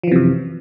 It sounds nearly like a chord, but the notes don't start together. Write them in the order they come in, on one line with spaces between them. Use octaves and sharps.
F3 E3 C3 F#2